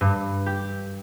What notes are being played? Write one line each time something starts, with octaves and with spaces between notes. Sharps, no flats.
G2
G4